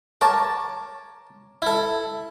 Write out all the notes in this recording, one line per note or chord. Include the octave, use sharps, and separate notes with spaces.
A#4 C#5 A5 D6
E4 A4